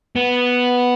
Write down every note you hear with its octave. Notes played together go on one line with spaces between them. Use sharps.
B3